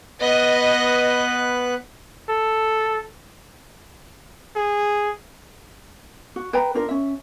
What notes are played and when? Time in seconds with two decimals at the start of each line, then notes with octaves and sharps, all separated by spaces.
0.21 B3 B4 D#5 F#6
2.29 A4
4.56 G#4
6.36 F#4
6.53 B4 G5 A#5
6.75 D4 F4 A#4
6.88 C#4 E5